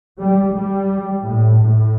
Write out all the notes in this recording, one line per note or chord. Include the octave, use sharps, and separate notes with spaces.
G3
G3
A2
A2